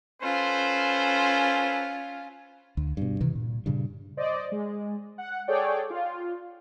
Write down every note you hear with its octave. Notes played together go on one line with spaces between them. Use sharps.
C#4 F4 A4 B4 C5
D2
G2 B2
C3 D#3 E3
A#2
G2 A#2 C#3
C5 D5 D#5
G#3
F#5
G#4 A4 C#5 D5 G5
F4